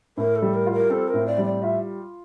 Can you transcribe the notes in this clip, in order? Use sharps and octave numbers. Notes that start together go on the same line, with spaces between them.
A2 A#4
A4
G3
A#4
F4
A#4
C4 A4
A#4
A2
D5
G3
D5
F4 E5